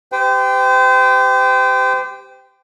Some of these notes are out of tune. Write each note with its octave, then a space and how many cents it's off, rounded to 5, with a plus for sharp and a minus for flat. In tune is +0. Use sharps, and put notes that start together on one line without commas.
G4 +0 C5 -35 G5 +0